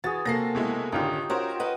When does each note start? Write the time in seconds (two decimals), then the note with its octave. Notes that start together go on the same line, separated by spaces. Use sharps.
0.04 E3 F#4 G#4 A6
0.25 C3 A#3 A4 A#6 C7
0.55 B2 G#3 E4
0.92 A1 D3 D#3 D#4 F4 G4
1.30 C#4 F#4 A#4 C5
1.59 B4 D#5 F#5